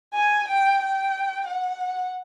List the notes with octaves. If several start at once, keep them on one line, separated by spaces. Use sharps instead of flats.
G#5
G5
G5
F#5